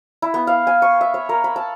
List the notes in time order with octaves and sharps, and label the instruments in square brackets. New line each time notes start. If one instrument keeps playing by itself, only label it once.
[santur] E4
B3
F5
G#5
C#6
E5
C#5
A#4
B5
A5